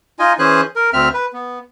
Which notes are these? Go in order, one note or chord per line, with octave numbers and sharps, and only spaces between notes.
D#4 F4 D#5 G#5
E3 C#4 G#4 C5 G#5 F#6
A#4
D2 C4 E5 F6
B4
B3